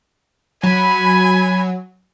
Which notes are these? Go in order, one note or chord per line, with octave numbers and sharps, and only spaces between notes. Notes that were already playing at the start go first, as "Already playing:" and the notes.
F#3 G#5 B5